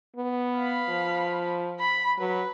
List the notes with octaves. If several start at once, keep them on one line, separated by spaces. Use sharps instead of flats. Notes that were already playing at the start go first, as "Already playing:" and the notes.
B3
F5 B5
F3
B5
F#3 B4